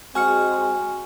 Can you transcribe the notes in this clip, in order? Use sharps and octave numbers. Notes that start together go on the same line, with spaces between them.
G#3 C4 F#4 G#5 F6 C#7